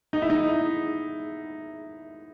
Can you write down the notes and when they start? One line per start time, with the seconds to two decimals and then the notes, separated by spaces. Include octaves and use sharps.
0.13 D#4
0.22 E4
0.30 D#4